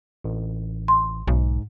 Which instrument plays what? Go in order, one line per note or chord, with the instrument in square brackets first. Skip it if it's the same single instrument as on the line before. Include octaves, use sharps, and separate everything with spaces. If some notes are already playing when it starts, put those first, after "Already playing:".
[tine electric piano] A1
[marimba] C6
[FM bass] B1 [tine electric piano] G#2